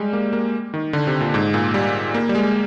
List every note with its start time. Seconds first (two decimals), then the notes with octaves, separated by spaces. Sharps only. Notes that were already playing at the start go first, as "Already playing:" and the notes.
Already playing: G3 G#3
0.13 A#3
0.33 A#3
0.74 D#3
0.93 D3
1.07 C3
1.21 A#2
1.34 G#2
1.54 A#2
1.74 G3
2.14 A#3
2.29 G3
2.35 G#3